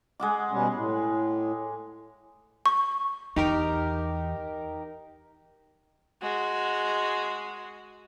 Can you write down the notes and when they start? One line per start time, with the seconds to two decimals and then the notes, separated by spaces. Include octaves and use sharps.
0.20 G#3 F#5 D6
0.51 B2 G3 C#4
0.74 A2
2.66 C#6
3.36 E2 D#4 G4 A#4
6.22 G#3 F#4